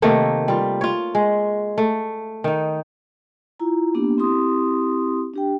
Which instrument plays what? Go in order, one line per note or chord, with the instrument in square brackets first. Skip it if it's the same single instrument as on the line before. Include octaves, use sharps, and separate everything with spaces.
[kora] C3 D#3 A3 A#3
G3 F4
F4 C#5
G#3
A3
D#3 D#4
[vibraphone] E4 F4 A#5
A#3 B3 D4 G4
C4 E4 G4 C6 D#6
D4 G4 G5